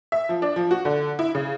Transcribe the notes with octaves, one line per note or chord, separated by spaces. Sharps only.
E5
F3
D4
F3
F#4
D3
E4
C#3